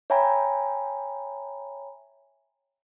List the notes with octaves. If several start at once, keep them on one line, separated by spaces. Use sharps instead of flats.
C#5 E5 G5 G#5 A#5 B5